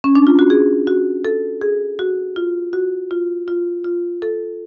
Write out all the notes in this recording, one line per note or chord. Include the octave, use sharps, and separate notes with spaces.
C#4
D4
F4
F#4
G#4
F#4
A4
G#4
F#4
F4
F#4
F4
F4
F4
A4